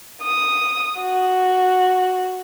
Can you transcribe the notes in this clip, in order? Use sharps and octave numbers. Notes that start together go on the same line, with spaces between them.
D#6
F#4